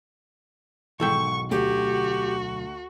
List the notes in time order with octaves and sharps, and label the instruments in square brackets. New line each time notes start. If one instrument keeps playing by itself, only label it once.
[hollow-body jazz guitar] B1 A4 G5 [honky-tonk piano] G#2 D#3 E3 [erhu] C#6
[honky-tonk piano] D2 [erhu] F#4 [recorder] G4